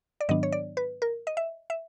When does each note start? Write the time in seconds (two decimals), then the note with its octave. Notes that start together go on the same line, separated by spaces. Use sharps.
0.21 D5
0.29 G#2 D#3 F#3 B3 D4 D#5
0.43 C#5
0.52 D5
0.77 B4
1.02 A#4
1.27 D#5
1.37 E5
1.70 E5